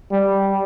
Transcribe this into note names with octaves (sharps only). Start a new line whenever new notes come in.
G3